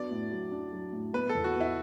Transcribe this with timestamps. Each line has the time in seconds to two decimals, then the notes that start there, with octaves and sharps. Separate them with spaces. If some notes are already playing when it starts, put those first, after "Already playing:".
Already playing: F#3 B3 D4 D5
0.11 A2
0.31 F#3
0.52 D4
0.73 F#3
0.92 A2
1.13 B3 B4
1.29 A4
1.35 E2
1.44 F#4
1.55 B3
1.60 E4